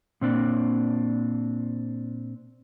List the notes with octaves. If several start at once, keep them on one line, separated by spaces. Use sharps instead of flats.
A#2 C4 D4